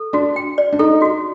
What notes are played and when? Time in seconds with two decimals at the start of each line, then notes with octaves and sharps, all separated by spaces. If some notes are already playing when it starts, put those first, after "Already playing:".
Already playing: A4
0.13 D4 F#4
0.36 G5
0.58 D5
0.72 D4
0.79 D#4 A4
1.02 F#4